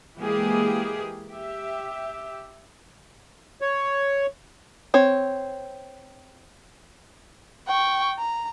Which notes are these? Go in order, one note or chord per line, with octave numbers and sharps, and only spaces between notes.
E3 G#3 A#3 G4 G#4
G4 E5
C#5
C4 C#5
G5 C#6
A#5